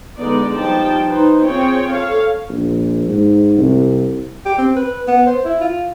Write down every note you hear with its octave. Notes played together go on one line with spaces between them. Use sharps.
D3 G#3 B3 D#4 D5
F3 G3 D#4 G5 A5
D#4 B4 C5
C4 F4 G#4 C#5 G5
A4 C#5 F5
A#1
G#2
C2
G4
C4
B4
B3
C5
E4
F4